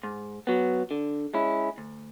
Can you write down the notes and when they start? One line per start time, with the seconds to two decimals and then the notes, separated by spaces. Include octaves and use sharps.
0.03 G#2
0.47 F#3 B3
0.91 D3
1.34 G#3 C#4 E4
1.78 D2